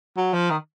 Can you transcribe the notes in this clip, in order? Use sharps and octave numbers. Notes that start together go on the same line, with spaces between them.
F#3
F3
D#3